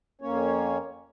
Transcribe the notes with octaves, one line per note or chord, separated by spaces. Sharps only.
F2 A#3 C#4 C#5